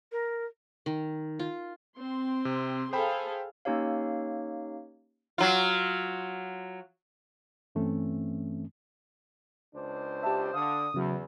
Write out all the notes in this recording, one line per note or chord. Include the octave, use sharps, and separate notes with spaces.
A#4
D#3
F4
C4 C6
C3
G#4 A4 C5 F5 G5 B5
A#3 C#4 D#4 G4 C#5 F5
F#3 F4
G2 E3 A3 C4 C#4
C#2 D4 C5
G4 E5 A5
D3 F5 D#6
E2 C#3 F#3